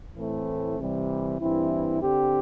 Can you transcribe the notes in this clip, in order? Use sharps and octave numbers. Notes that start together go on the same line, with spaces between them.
A2 E3 A3 C4
C3 E3 G3
G2 E3 C4 E4
D3 C4 G4